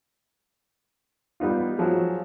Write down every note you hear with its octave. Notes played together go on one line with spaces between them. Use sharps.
G3 B3 D#4 F4
F3 F#3 G#4